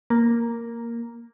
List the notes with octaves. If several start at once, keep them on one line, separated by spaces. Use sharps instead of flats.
A#3